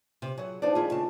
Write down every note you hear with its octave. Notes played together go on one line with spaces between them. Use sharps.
C3
F#3 G#4 F#5
F3 D4 D#4 C5 D5
D#3 A3 E4 F4 G#4
C#3 A5